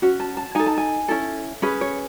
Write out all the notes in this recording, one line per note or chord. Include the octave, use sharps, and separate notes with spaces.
C#4 F#4
A5
A5
D#4 A4 G#5
A5
G#5
C#4 E4 A4
C#4 G#4 B4
C#5